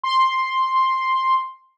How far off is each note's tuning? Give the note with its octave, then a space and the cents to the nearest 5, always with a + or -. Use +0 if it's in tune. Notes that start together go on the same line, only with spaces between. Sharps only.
C6 +5